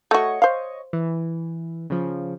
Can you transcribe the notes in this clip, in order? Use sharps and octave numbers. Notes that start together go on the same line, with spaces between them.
A3 F#4 C#5 D#5 C#6
C5 F5
E3
C#3 F3